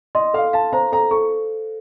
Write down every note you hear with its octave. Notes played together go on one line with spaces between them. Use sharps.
D#5 C6
A4 F5
F5 A5
C5 A#5
A4 A#5
A4 C#6